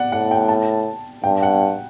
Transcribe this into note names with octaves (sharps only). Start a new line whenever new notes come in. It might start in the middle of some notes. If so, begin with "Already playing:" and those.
Already playing: D5 F#5
A2 F#5
G5
A5
G2 G5
F#5